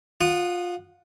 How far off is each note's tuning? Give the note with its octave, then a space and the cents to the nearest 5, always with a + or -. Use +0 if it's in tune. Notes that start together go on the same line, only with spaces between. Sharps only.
F4 +20 F#5 +0 D#6 -20